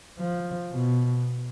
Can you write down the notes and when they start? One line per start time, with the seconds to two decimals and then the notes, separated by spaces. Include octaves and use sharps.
0.19 F3
0.72 B2